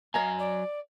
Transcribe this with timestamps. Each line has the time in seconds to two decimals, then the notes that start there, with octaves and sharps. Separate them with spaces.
0.14 F#3 C#5 D#5 F5 G#5 A#5
0.38 D5